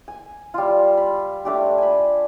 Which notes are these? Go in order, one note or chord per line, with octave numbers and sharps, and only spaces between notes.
G#5
G3 F4
B5
A3 D4 G4
G#5 B5